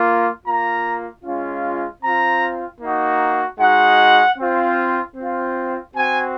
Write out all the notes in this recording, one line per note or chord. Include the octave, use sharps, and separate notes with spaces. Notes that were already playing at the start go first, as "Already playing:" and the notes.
Already playing: A#3 F4
A#3 F4 A#5
G#3 C#4 F4
C4 F4 A#5
A#3 D#4 F#4
G#3 D#4 F#4 F#5
C4 F4
C4
F4
C4 F#4 G#5